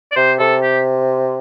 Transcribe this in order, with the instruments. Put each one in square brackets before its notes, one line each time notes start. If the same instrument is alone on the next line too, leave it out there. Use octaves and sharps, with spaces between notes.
[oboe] D5
[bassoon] C3 [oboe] C5
[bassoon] C3 [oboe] A4
[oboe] G4